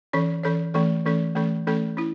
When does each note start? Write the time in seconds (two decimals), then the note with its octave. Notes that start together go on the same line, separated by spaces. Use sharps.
0.13 E3 C#4 A4 C#5
0.43 E3 C#4 A4 C#5
0.74 E3 A3 C#4 A4
1.05 E3 A3 C#4 A4
1.35 E3 A3 C#4 A4
1.67 E3 A3 C#4 A4
1.97 C#4 E4